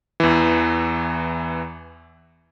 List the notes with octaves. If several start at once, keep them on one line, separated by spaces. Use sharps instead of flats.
E2 E3